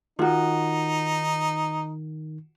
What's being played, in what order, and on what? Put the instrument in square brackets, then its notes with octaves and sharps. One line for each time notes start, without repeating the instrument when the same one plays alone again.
[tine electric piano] D#3 [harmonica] D#4 [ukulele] F4 F#4